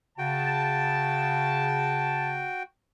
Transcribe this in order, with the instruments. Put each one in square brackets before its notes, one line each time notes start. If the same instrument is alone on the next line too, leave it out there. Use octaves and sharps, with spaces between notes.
[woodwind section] C#3 [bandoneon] F#4 G5 [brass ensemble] A5